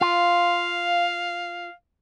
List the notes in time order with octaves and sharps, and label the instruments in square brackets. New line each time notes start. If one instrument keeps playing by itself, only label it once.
[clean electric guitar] F4 [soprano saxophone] F5